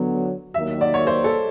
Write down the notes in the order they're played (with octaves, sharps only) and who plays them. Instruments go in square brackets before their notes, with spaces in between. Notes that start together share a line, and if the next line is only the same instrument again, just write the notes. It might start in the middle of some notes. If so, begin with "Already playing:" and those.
Already playing: [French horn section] D3 F#3 B3
[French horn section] D#2 D#3 F#3 A#3 [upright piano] E5
[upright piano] D5
C#5
C5
A4